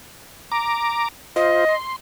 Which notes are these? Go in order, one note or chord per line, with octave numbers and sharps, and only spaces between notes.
A#5 D6
F4 C5 D#5
C6